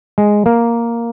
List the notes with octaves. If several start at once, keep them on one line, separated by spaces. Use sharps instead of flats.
G#3
A#3